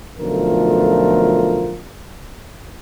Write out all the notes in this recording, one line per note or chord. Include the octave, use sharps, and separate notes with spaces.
B1 D3 F3 A3 F4 A#4